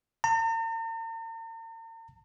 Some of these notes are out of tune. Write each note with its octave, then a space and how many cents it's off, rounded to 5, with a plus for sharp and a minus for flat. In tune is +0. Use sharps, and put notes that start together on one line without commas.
A#5 -45